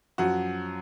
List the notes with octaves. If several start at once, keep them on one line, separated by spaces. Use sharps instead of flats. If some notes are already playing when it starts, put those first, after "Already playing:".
F#2 F3 F#4